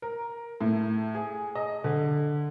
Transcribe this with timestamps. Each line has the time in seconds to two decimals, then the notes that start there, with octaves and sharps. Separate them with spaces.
0.02 A#4
0.61 A2
1.15 G#4
1.55 D#5
1.84 D3